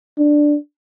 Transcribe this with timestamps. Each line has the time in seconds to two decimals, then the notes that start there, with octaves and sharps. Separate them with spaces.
0.18 D4